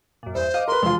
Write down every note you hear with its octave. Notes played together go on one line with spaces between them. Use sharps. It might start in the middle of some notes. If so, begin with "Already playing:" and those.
F#2 A#2
E2 G2 C5 E5
D#5 F5 D6
A#4 B4 C6
E1 C3 F3 G#3 F4